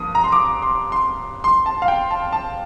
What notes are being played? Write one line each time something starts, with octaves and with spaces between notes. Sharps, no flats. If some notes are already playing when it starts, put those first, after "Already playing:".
Already playing: G2 F3 A#3 D#6
A#5
C6
D6
C6
C6
C6
A5
F5
G5
A5
A5